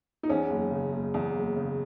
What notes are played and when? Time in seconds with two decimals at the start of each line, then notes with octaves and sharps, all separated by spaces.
0.23 D#4
0.29 E2 C#4
0.50 F#1
0.71 C#3
0.92 F#1
1.14 E2
1.34 F#1
1.56 C#3